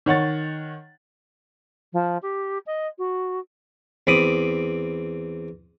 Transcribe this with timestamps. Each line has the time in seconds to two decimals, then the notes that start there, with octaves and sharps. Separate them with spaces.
0.06 D#3 C#5 F#5 A6
1.93 F3
2.22 G4
2.66 D#5
2.98 F#4
4.07 E2 C4 B5 D6 D#6